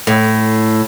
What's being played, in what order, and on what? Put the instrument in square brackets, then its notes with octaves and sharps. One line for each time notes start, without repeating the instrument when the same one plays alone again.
[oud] A2